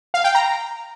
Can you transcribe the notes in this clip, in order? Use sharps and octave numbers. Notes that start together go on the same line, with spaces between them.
F5
G5
A#5